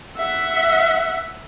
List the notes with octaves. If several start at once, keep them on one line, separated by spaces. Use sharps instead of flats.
E5 F#5